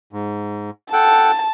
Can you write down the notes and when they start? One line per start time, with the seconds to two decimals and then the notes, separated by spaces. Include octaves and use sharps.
0.13 G#2
0.93 A4 F#5 G5 A5